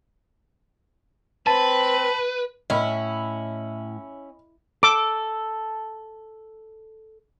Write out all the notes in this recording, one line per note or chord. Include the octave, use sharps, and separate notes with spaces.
C4 B4 A5 B5
A2 C#4 E4 D#5 B5
A4 D6